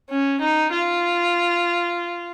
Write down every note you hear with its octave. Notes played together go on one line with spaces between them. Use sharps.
C#4
D#4
F4